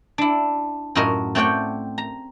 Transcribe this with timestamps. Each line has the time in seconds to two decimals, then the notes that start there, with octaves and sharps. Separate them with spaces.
0.18 D4 E4
0.95 F#2 A2 F4 F#4 A#4 D#5
1.35 A3 C4 C#5 D5 F#5 G5
1.98 A#5